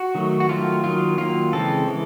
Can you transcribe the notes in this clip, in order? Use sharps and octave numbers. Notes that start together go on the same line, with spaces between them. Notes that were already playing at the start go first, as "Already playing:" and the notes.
Already playing: F#4
D#3 F#3 A3
F#4
D#3 F#3 A3 F4
D#3 F#3 A#3 F4
D#3 F#3 A#3 F4
C#3 E3 G#3 C4 A4
C#3 E3 G#3